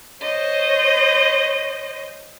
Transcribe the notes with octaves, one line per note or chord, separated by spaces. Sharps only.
C5 C#5 D#5